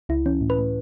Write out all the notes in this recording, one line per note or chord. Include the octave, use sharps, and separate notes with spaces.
C#2 E4
E3 C#4
A2
B4
A2